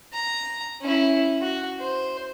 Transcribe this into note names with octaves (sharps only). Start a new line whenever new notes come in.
A#5
C#4 E4
F#4
C5